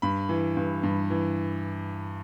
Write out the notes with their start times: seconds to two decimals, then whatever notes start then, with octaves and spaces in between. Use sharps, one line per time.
0.02 G2 B5
0.29 E3
0.57 G2
0.83 G2
1.10 E3